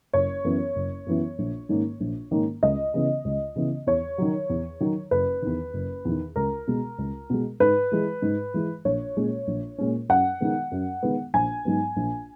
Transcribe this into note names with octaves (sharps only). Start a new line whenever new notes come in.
F#1 C#5
F#2 E3 B3
F#1
F#2 E3 B3
A#1
G#2 D#3 A#3 C#4
A#1
G#2 D#3 A#3 C#4
C#2 D#5
C#3 E3 B3
C#2
C#3 E3 B3
E2 C#5
D#3 F#3
E2
D#3 F#3
F#1 B4
E2 D#3
F#1
E2 D#3
C#2 A#4
B2 G#3
C#2
B2 G#3
G#2 B4
E3 G#3
G#2
E3 G#3
A#1 C#5
A#2 G#3 C#4
A#1
A#2 G#3 C#4
F#2 F#5
D#3 G#3 B3
F#2
D#3 G#3 B3
A#1 G#5
G#2 F#3 B3
A#1